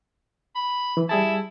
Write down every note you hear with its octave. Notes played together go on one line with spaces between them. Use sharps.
B5
E3
G3 E4 G#4 A5